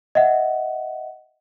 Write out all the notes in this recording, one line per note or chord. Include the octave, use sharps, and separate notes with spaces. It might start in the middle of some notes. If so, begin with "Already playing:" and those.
D#5 E5 F#5